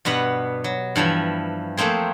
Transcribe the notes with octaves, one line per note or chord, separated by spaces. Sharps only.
G2 B2 B3 B4 F#5
F#3
G2 E3 F3 E5
F2 A3 A#3 C4 G#4